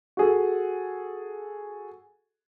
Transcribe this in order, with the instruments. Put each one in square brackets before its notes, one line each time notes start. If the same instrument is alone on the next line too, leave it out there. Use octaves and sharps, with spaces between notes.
[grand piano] F#4 G#4 A4